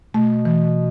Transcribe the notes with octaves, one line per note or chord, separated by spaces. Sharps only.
B2 A3
E3